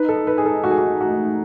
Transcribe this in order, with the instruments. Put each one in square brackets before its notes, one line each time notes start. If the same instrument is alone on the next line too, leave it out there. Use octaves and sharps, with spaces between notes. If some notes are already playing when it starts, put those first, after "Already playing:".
Already playing: [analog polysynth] D#4 [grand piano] B4
[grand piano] A4
[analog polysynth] D#4 [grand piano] B4
[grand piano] G#4
A4
[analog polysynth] A3 [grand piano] F#4
[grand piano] G#4
F#4
[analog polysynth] D#4 [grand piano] F#4